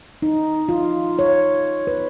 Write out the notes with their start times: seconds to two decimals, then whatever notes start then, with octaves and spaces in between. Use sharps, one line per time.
0.22 D#4
0.69 F4
1.19 C#5
1.87 B4